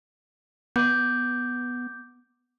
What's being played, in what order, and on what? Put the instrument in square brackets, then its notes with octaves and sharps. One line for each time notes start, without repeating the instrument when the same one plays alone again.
[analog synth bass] B3 [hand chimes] D6 G6